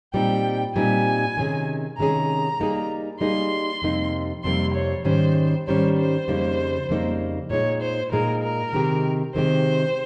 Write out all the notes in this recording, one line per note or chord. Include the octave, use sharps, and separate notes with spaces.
A#2 G3 C4 D#4 G5
A#2 G3 C4 D#4 G#5
C3 D#3 G#3 C#4 G#4
C3 D#3 G#3 C#4 G#4 A#5
G3 A#3 D#4 G#4
G3 A#3 D#4 G#4 C6
F2 C3 G3 A#3 D#4
F2 C3 G3 A#3 D#4 C6
C#5
G#2 D#3 G3 C#4 C5
G#2 D#3 G3 C#4 C5
C5
F2 C#3 G3 A#3 D#4
F2 C#3 G3 A#3 D#4
A#2 G#3 D#4 C#5
C5
A#2 G#3 D#4 A#4
A#4
C3 D#3 G#3 C4 G4
C3 D#3 G#3 C4 G4 C5